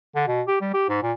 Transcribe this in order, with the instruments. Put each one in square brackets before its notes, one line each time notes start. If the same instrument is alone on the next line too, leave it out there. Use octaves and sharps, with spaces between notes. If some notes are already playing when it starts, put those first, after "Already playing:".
[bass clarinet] D3
B2
G4
G3
G4
G#2
A#2